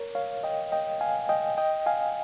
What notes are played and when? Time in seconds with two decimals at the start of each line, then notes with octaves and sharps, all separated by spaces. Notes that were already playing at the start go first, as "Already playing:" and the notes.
Already playing: A#4 C#5
0.15 C#5 F5
0.44 D#5 G5
0.72 D#5 G5
1.01 F5 G#5
1.29 D#5 G5
1.58 D#5 G5
1.86 F5 G#5